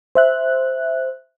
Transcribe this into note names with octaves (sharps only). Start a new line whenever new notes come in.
C5 E5 F#6